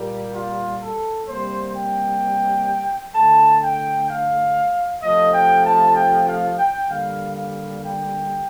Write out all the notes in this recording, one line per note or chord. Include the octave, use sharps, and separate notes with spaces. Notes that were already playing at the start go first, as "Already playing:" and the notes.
Already playing: A#2 G3 A#3
F4
A4
C3 G3 A#3 C5
G5
D3 A3 A5
G5
F5
C3 F3 A3 D#5
G5
A5
G5
F5
G5
D3 G3 A#3 F5
F5
G5